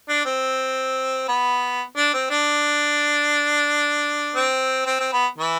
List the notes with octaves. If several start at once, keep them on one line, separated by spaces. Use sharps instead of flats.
D4
C4
B3
D4
C4
D4
C4
C4
C4
B3
E3